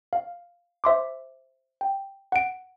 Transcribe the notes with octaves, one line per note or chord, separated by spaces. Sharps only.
F5
C5 E5 C6 D6
G5
F#5 D7